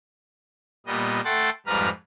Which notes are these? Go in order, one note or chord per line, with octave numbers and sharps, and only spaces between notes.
A#2 G3 B3 D#5
A3 A4 F#5 G5 C6 A6
F2 G#2 G3 B4 A#5 F6